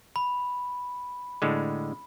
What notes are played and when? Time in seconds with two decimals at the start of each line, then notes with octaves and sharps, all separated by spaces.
0.16 B5
1.42 A2 D3 G#3